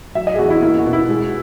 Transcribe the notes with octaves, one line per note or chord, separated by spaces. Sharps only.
F#3 E5
D#5
G#4
E2 F#4
E4
A#3 E4
F#4
B2
E4
G#3